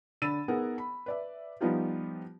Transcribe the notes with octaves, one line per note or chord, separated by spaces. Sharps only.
D3 B5 E6 A6 D#7
B3 D#4 G#4 A#4 F#5
B5
B4 D5 E5
F3 G3 B3 D#4 F4 G4